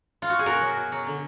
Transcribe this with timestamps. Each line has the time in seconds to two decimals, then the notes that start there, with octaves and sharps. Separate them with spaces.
0.22 F4
0.29 F#4
0.39 G#4
0.46 B2 F#4 A#4
0.61 F#3
0.77 B2
0.92 F#3
1.07 D3